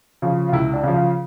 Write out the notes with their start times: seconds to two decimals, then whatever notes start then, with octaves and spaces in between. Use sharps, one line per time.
0.22 C#3 F3
0.49 F4
0.52 C#2 E4
0.73 D4
0.83 C#3 F3
0.94 F4